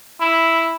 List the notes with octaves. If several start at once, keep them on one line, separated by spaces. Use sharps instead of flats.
E4